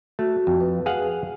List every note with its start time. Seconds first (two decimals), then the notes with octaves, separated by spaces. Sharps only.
0.19 A3 F#4
0.47 F2
0.60 B4
0.86 G#4 F5 F#5